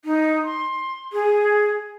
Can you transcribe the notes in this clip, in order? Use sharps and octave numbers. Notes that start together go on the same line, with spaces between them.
D#4
C6
G#4